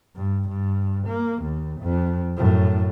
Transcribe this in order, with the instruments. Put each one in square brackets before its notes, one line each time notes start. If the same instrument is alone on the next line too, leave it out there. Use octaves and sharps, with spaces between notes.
[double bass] G2
G2
A#3
D#2
F2
F#2 A2